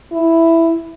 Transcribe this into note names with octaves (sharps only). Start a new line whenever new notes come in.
E4